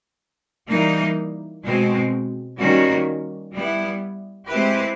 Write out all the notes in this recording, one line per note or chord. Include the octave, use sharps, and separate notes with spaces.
E3 G3 A#3 D#4
B2 G#3 C4
D#3 G3 A#3 C#4 F#4
G3 B3 E4
G#3 C4 E4 G4 B4